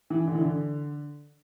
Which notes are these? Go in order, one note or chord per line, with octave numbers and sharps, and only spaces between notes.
E3
D3
E3
D3